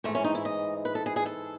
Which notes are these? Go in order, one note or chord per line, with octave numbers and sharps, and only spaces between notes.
G#2 E3 A3
C#4
D#4
E4
D#5
B4
A4
G#4
G#4
A4